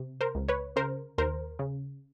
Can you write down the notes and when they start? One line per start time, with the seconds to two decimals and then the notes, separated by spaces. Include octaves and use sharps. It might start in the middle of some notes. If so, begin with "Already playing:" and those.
Already playing: C3
0.21 A#4 C5
0.35 C#2
0.49 B4 C#5
0.76 C#3 A#4 C5
1.18 D#2 A#4 C5
1.59 C#3